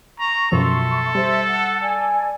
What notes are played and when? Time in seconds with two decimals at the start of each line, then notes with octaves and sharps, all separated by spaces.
0.19 A#5 C#6
0.52 F#2 B2 F3 A4 E5 C6 C#6
1.15 G3 C5 E5
1.48 F#5
1.81 D5 G#5